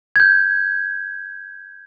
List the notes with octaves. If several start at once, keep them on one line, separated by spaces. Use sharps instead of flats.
G6 G#6